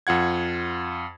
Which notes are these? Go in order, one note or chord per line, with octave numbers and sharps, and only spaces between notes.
F2 F4 F#5 G#6